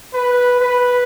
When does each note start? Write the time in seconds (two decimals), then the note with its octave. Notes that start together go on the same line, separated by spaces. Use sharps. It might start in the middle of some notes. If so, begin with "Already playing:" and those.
0.14 B4
0.60 B4